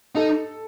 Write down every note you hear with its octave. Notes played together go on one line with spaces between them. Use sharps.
D#4 A4